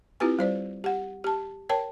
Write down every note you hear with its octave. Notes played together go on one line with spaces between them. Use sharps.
C4 E4 F4 G4 B4 G#5
G3 C5 D5
G4 F#5
G4 A5
A#4 C#5 G5 A5